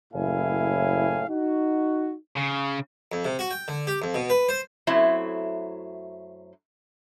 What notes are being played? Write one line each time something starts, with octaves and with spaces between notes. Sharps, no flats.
F#1 A2 E4 F5 G#5
D#4 F#4
C#3
F2
C3
F#4
G5
D3
G4
F2
B2
B4
C5
F#2 F#3 A3 C4 E4